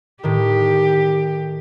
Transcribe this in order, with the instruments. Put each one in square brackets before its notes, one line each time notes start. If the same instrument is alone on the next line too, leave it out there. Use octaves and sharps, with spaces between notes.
[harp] A2 D#3 [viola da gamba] G4